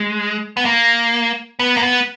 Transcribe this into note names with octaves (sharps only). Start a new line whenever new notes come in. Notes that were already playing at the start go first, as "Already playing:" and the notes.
Already playing: G#3
B3
A#3
B3
A#3
B3